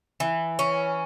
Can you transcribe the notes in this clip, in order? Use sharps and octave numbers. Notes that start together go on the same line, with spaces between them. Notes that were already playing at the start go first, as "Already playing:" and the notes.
E3
C#4